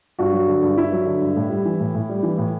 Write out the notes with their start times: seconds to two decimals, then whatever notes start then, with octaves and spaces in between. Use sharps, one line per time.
0.19 G2 F#4
0.33 F#3
0.47 D3
0.62 G2
0.77 G2 E4
0.92 F#3
1.06 D3
1.21 G2
1.36 A2
1.50 G3
1.65 E3
1.80 A2
1.95 A2
2.09 G3
2.23 E3
2.38 A2